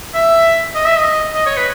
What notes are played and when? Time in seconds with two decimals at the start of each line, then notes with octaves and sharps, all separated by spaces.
0.14 E5
0.75 D#5
0.86 E5
0.97 D#5
1.35 D#5
1.46 C#5
1.57 B4